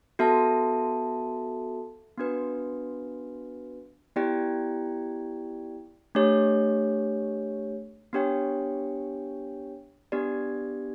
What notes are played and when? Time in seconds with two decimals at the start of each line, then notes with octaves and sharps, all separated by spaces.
0.19 B3 F#4 A4 E5 A5
2.18 B3 D4 F#4 B4
4.16 B3 E4 G4 D5 G5
6.15 A3 D4 G4 C#5
8.13 B3 D4 G4 C#5 G5
10.12 B3 D4 G4 D5